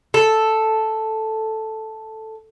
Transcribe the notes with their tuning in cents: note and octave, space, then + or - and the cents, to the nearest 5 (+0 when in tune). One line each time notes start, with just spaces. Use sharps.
A4 +0